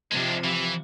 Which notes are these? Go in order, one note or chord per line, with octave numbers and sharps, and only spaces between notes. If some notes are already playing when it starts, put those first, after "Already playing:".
C3 F3 G#3 D4
E3